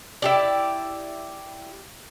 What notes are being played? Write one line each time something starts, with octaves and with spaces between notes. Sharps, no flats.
E4 G4 D5